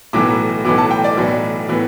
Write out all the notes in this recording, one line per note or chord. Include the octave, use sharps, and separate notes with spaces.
B1 A2 E3 B3 D6
B1 A2 E3 B3 D6
A5
G5
D5
B1 A2 E3 B3
A2 E3 B3